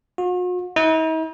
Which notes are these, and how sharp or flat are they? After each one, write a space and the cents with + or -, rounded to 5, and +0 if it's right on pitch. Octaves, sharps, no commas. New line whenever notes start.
F#4 -45
D#4 +45